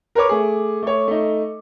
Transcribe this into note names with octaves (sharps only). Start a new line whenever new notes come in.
A#4 B4 C#5 D6
A3 G#4
A3 C#5
A3 D#4